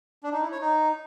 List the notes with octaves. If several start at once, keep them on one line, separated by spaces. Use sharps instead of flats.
D4
D#4
E4
C#5
D#4